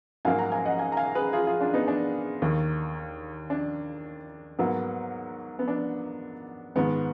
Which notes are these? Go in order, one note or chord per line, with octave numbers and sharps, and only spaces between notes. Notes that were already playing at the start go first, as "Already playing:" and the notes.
G#2 F#3 A#3 F5 G#5
F#5 A#5
F5 G#5
D#5 F#5
F5 G#5
A#5
F5 G#5
G#4 B4
F4 G#4
F4 G#4
D4 F4
B3 D#4
D4
D#2 D#3 A#3
D4
G#2 F#3 A#3 B3
B3
D4
G#2 D#3 G#3 B3